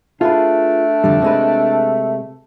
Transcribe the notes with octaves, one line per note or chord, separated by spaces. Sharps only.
A3 D4 F4 G#4 B4
F2 D3 G3
C3 G#3 B4